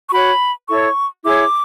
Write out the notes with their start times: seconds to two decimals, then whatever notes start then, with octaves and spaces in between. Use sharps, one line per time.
0.08 C#6
0.13 F#4 C#5 B5
0.68 E4 A4 C#5 C#6
1.23 E4 G#4 C#5 D6